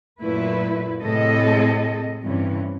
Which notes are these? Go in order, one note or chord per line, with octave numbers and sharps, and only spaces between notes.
F#2 A#2 A3 E4 B4
A2 C3 C4 G#4 A4 D#5
G2 C3 E3 C#4